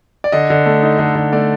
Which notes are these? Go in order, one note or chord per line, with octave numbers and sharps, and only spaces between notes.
D5
D3 D#5
D3
A3
D#4
D3 D#5
D3
A3 D5